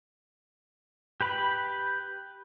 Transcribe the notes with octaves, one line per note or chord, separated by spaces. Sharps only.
G4 B4 B5